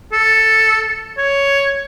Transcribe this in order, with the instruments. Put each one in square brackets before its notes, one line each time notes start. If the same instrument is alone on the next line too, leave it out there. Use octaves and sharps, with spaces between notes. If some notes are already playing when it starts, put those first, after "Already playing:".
[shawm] A4
C#5